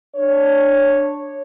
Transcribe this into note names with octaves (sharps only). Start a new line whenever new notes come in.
D4 C#5